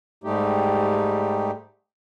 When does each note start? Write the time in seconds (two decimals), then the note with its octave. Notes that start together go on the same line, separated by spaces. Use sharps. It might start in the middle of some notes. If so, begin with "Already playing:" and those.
0.24 G#2 G3 A3 D#4 G4